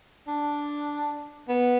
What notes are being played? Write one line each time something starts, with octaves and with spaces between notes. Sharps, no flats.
D4
B3